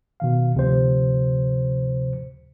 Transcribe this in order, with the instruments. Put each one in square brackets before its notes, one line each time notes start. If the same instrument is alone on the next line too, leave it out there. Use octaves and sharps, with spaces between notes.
[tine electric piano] B2 D#3 F5
D2 C3 F3 C5